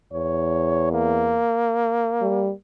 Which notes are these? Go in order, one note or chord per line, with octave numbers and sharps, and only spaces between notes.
E2 C#5
A#3
G3